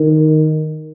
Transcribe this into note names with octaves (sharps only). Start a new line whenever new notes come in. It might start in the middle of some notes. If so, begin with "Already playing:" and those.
Already playing: D#3